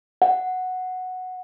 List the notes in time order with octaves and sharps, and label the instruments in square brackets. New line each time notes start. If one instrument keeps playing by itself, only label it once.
[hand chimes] F#5